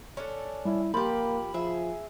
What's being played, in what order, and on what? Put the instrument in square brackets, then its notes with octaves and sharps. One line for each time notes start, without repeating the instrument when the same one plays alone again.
[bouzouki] C#4 D4 A4
[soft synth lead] G3 [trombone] E4
[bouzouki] F3 G4 [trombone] A#3 [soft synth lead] B5
[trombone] F3 [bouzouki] G#4 E5